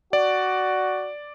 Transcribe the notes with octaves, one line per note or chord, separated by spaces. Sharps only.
F#4 D5